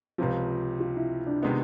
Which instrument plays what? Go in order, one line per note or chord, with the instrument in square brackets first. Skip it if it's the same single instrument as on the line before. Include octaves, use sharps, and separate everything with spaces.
[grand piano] C#2 C3 F3 [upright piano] F4
[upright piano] F4
E4
D4
[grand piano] C3 D#3 G#3 B3 D#4